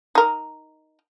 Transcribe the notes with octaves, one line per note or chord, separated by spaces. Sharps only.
D#4 A#4